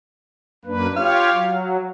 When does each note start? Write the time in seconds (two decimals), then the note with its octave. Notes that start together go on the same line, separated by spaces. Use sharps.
0.65 F#2 A#3 D4 B4
0.96 F4 G4 C#5 F5
1.32 F#3